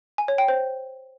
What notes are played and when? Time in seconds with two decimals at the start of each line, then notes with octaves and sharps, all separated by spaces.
0.18 G#5
0.28 C#5
0.38 G5
0.48 C5